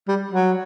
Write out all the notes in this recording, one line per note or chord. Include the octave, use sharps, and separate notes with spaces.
G3
F#3